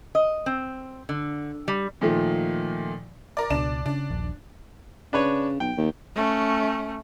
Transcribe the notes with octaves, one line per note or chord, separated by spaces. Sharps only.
D#5
C4
D3
G3
A#2 D#3 F3 A3
A#4 D5
C#2 B2 D4 D5 E7
C#3 D4
D#1 A#1
C#3 D4 B4 C#5
B1 G5
D#2
A3 C#4